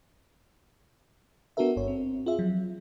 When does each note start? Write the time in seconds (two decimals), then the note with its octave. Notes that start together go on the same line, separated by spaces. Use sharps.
1.57 B3 D4 F#4 A4 A#4 E5
1.76 G1 G2 C#5
1.88 C4
2.26 F4 G#4 E5
2.39 F3 F#3